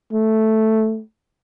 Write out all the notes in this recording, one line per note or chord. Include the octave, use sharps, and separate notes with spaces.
A3